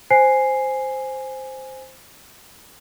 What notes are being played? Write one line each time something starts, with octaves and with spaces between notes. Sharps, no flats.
C5 G#5 C7